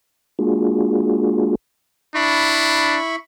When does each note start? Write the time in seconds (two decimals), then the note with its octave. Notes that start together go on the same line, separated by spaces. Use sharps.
0.39 G#3 A#3 D4 F4 F#4 G#4
2.15 D4 E4 B5 C#6